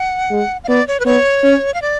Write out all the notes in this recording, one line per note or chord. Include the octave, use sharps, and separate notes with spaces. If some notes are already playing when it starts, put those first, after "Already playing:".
Already playing: F#5
G#3
F5
B3 D5
C#5
B4
B3 C#5
C#4
F5
D5